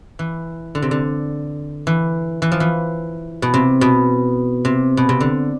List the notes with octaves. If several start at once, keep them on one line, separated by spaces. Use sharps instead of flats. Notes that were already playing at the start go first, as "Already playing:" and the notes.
E3
D3
C3
D3
E3
E3
F3
E3
B2
C3
B2
C3
B2
C3
D3